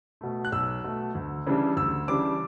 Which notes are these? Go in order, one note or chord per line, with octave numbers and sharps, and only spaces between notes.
B2 A3
F#6
B1 E6
B2 A3
D2
C#3 E3 G3 D4
D2 E6
C#3 E3 G3 D4 D6